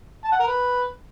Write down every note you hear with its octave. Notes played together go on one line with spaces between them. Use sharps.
A5
F#5
A#4
B4